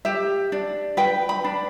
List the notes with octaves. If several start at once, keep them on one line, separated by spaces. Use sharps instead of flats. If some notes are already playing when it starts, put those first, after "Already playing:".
G4 E5
D4
B4 G5
B5
D4